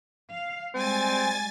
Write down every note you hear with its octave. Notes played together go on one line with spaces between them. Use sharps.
F5
G3 G#3 C4 G#5 A6